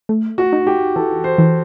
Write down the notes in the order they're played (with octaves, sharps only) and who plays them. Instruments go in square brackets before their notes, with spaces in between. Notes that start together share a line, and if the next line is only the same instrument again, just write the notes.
[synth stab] A3
[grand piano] F#4
[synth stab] D#4
[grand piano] G4
[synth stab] E3 [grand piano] A4
[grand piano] C5
[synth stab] E3